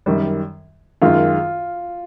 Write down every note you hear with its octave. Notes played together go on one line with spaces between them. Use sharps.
F#2 D#3 G3
F#2 D#3 G#3 F4